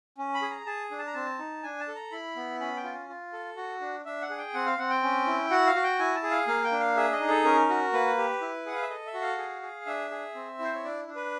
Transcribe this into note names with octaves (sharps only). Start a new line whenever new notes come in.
C#4
B5
G#4
A#5
G#4 A5
D4
A5
A#5
C4 A5
D#4
D4 G#5
A5
A4
A#5
E4 B5
B3
C#4 B5
G5
F4
F4
A4
F#4
D4
D4 E5
F#5
G#4
G5
C4 F#5
F5
C4 F#5
G5
C#4
E4
F#4 F#5
F5
F#4
G5
E4 G#5
A5
G#4
F5
A#3 F5
G5
D4
F5
G#4 E5
D#5
D#4
A4
C#4 A#4
F#4
A#3 B4
G4
E4
G#4 F#5
F5
E5
A4 D#5
E5
F#4
F5
G#4
G#4
D4 E5
G#4
C4
E4 C5
C#5
D4 D5
D4
B4